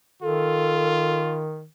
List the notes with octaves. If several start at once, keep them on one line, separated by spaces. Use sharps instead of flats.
D#3 F4 A4